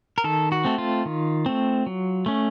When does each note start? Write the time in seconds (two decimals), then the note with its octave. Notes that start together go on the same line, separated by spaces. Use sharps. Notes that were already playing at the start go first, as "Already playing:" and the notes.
0.18 A#4
0.24 D#3 A4
0.52 F#4
0.65 A3 C4
0.78 F4
1.06 D#3
1.46 A3 C4
1.87 F#3
2.26 A3 C#4